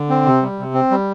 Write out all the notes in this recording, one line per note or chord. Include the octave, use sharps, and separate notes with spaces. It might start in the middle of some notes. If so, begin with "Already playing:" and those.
Already playing: D3
C4
C3
G3
C3
C4
G3